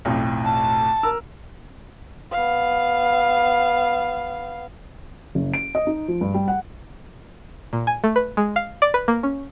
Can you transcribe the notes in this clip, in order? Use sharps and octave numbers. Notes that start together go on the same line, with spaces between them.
B1 F2 A2
A5
A#4 E6
B3 F5
F#1
D7
D#5
D#4
F3
G2
G3
F#5
A#2
G#5
A3
B4
G#3
F5
D5
B4
A#3
C#4